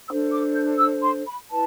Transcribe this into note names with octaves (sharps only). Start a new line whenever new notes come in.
D4 A4 C5 E6
D6
G6
E6
C6
B5
E4 B4 A5